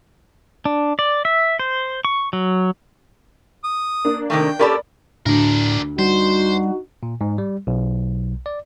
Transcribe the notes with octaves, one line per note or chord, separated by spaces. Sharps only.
D4
D5
E5
C5
C#6
F#3
D#6
A#3 D4
C3 D#3 A3 G5
C#4 G4 A4 A#4 D5 B5
D2 A2 D4 A#4
G3 D#4 F#4 C5
A#2
G#2
G3
B1
D5